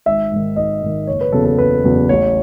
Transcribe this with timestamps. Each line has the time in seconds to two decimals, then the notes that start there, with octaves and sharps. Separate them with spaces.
0.06 G#1 E5
0.31 G#2 D#3
0.56 G#1 D#5
0.82 G#2 D#3
1.07 F#1 C#5
1.21 B4
1.32 E2 C#3 F#3 B3 A4
1.45 A4
1.58 F#1 B4
1.84 E2 C#3 F#3 B3
2.09 A1 C#5